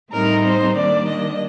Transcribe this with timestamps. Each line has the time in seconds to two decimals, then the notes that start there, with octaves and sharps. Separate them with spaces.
0.11 A2 G3 C4 D#4 A#4
0.44 C5
0.76 D#3 G3 A#3 D4 D5
1.08 D#5